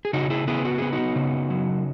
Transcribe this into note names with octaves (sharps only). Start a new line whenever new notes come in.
G#4
C#3 D#4 F#4
E4 G#4
B3 E4 G#4
F#4
B3 G#4
D#4 F#4
C#3
F#3